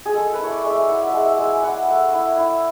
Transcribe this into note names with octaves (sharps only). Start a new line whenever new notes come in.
G#4
G#3 A4
B4
E4 C#5
D5
G#3
E5
E4 F#5
E5
G#3
E5
G#3
G#5
E4 F#5
A3
E4
E4